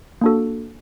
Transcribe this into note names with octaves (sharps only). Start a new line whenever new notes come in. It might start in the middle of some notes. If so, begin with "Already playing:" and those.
A#3 D4 F#4 A4